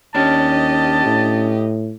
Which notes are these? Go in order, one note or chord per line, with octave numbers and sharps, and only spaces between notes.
D#2 C#4 D4 G4 D#5 A5
A2